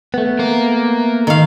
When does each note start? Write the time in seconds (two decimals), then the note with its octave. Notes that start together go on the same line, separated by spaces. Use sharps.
0.14 A3 B3
0.39 A#3 A#4
1.27 D#3 F5